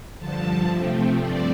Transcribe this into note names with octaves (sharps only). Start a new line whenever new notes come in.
G2 D3 F3 A5
C3 F3 A3 C4
G2 F3 A3 C4 D5